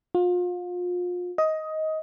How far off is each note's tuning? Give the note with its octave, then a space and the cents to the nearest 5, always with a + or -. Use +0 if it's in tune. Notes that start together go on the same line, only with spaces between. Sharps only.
F4 +35
D#5 +15